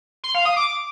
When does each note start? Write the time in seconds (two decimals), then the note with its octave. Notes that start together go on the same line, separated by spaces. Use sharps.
0.24 C6
0.34 F5
0.45 D#6
0.56 D6